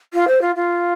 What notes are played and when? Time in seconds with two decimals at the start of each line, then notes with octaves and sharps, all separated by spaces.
0.13 F4
0.27 C5
0.41 F4
0.55 F4